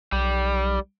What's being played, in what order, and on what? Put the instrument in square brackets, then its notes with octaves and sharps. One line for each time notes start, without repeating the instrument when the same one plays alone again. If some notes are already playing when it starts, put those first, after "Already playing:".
[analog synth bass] B1 [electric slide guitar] G3